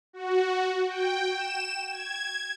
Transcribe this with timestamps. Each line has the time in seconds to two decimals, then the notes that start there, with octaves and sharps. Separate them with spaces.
0.13 F#4
0.86 G5
1.32 E7
1.91 G#6